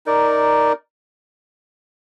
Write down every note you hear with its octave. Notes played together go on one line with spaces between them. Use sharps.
D#4 A#4 D5